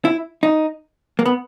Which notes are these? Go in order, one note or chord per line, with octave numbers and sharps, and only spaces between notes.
E4
D#4
A#3
B3